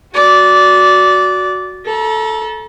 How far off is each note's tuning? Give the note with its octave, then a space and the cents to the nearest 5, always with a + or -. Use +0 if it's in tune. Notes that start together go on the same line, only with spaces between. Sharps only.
F#4 +0 D5 -15
A4 -5 A#5 +40